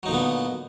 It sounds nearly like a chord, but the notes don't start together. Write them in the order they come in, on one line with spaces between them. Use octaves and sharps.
F#3 D#4 A#2 D3 B3